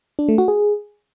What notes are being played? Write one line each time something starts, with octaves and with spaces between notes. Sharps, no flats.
D4
A3
F#4
G#4